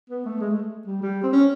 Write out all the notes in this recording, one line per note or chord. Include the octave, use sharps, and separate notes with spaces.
B3
A3
G#3
A3
G3
G3
C4
C#4